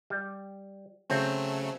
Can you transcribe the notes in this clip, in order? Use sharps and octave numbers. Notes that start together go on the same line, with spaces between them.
G3
C#3 F#3 A3 C4